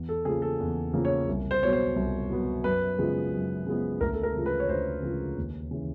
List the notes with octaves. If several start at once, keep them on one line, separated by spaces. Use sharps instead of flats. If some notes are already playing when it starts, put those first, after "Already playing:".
Already playing: E2
A4
C#3 F3 A#3 G#4
A4
E2
C#3 F3 A#3
C#5
C2
C5
B2 F#3 B3 C#5
C5
C2
B2 F#3 B3
F#2 B4
C#3 F3 G#3 B3
F#2
C#3 F3 G#3 B3
D2 A#4
A4
A#4
C#3 F3 G#3
B4
C#5
D2 C5
C#3 F3 G#3
D#2
C#3 E3